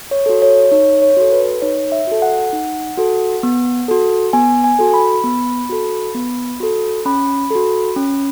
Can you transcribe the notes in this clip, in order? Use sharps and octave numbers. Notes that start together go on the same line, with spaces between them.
C#5
F#4 A4
C#5
D#4 C#5
C#5
F#4 A4
B4
D#4 C#5
E5
F#4 A4
F#5
D#4
F#4 A4
B3
F#4 A4
B3 G#5
G#5
F#4 A4
B5
B3
F#4 A4
B3
F#4 A4
C#4 B5
F#4 A4
C#4